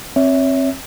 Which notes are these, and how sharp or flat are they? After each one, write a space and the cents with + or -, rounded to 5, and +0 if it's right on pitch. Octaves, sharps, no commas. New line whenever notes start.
C4 +30 C#5 +25 E5 -10